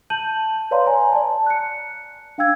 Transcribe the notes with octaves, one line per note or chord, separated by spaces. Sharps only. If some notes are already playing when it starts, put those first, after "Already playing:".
A5 G6 D#7 F#7
B4 C#5 D5 F5 A#5 C6
G#5 A#5
D5 A5
F#6 C#7
D4 F5 G5 E6 G#6